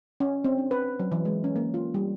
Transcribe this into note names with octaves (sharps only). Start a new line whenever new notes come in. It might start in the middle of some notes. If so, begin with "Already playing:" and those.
C#4
C4
D4
B4
F#3
E3
G#3
C#4
A#3
F4
G3